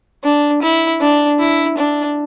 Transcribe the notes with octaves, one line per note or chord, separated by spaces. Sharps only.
D4
E4
D4
E4
D4